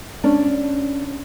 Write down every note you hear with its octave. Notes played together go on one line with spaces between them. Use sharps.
C#4 D4